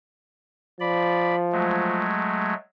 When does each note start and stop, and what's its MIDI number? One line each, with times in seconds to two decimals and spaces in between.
0.80 2.12 53
0.80 1.35 74
0.80 1.35 83
1.52 2.54 54
1.52 2.54 56
1.52 2.54 57